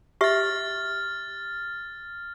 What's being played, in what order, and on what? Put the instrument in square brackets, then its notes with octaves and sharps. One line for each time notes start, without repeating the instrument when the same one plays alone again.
[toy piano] G4 E5 [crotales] F6 A6